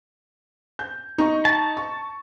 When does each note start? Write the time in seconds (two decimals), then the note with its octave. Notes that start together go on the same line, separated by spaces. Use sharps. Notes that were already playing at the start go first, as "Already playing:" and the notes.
0.79 G6
1.18 D#4 C#6
1.45 A5
1.77 C#6